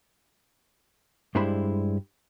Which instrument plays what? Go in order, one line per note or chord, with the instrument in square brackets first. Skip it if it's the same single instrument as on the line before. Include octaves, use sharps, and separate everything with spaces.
[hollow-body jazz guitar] G2 G#3 D4 E4 C5 B5